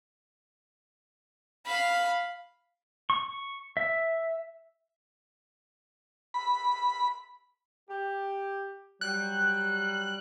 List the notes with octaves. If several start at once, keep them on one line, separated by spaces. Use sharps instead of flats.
F5 B5
C#6
E5
B5
G4
F#3 G3 F#6